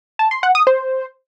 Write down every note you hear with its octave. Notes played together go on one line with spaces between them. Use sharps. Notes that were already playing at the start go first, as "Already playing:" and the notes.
A5
C6
F#5
D#6
C5